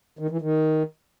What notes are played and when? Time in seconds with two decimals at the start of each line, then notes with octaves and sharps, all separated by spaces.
0.19 D#3
0.30 E3
0.41 D#3